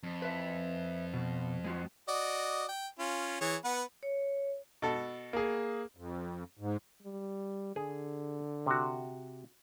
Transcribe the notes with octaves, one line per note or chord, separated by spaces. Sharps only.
F2
B4 E5
B2
G#3 F4 F#4
F#4 D5 D#5
G5
C#4 F4
E3 G#4 C#5
B3 B4 F#5
C#5
B2 A4
A#3 G#4
F2
G#2
G3
D3 G#4
C3 F#4